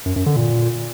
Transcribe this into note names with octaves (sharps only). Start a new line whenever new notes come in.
F#2
F#2
D3
A#2